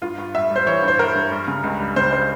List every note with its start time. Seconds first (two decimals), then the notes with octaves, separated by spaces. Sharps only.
0.02 G2 F4
0.18 G2
0.34 G3 E5
0.50 G3
0.56 C5
0.66 E3 C#5
0.83 G2
0.88 C5
0.99 G3 A#4
1.15 G2
1.31 G3
1.48 C#3
1.63 C#2
1.80 G3
1.96 C#3 C5
2.12 G3 C5